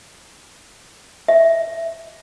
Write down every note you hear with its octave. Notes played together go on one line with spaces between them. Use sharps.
E5